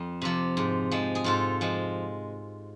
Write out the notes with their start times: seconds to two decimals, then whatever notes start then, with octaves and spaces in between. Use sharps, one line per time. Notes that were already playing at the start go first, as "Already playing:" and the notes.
Already playing: F2
0.22 C3 F3
0.57 G#2
0.91 F3 G#3
1.15 G#4
1.24 G#2 F4 A4
1.61 F3 G#3